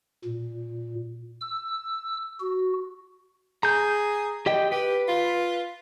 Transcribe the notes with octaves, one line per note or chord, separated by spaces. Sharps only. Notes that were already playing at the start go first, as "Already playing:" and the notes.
A#2
E6
F#4
G#4 A#5 G6
G4 D#5 G5
G4 B4
F4